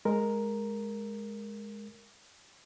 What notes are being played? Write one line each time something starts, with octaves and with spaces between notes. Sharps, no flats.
G#3 A#4